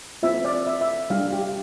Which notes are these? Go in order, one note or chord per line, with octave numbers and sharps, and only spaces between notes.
C4 F4 E5
D5
E5
E5
G3 D4 G4 F5
G4